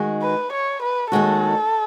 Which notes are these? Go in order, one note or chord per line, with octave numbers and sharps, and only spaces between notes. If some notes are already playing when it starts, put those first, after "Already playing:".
Already playing: D#3 G#3 D#4 F#4
B4
C#5
B4
D#2 D#3 G#3 D#4 F#4 A4